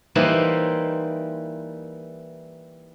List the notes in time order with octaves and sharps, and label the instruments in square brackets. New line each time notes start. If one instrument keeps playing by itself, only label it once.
[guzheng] E3 G3 A#3 D#4 E4 C5